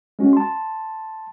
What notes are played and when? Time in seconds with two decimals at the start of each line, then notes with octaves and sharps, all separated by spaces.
0.19 G#3 C#4 F#4
0.33 A5 C6